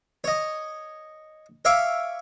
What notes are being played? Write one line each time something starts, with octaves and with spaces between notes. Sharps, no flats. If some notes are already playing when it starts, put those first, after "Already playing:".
C#5 D#5
C#5 E5 F5 C#6 D6